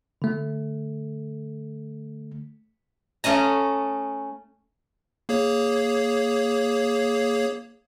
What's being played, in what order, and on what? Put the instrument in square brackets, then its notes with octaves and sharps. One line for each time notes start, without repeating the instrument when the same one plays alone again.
[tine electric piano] D3 A3
[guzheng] A3 C#4 D#5 A#5
[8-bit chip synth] A#3 G#4 C#5